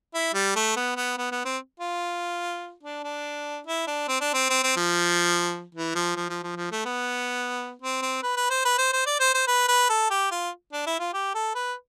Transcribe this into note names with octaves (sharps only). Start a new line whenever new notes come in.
E4
G3
A3
B3
B3
B3
B3
C4
F4
D4
D4
E4
D4
C4
D4
C4
C4
C4
F3
E3
F3
F3
F3
F3
F3
A3
B3
C4
C4
B4
B4
C5
B4
C5
C5
D5
C5
C5
B4
B4
A4
G4
F4
D4
E4
F4
G4
A4
B4